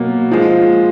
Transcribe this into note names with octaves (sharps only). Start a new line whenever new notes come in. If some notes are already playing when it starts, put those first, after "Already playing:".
Already playing: B2 F#3 A#3
F3 G#3